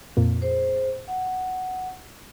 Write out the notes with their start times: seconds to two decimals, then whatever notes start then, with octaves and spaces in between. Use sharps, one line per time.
0.17 F2 A#2
0.42 G#4 C5
1.08 F#5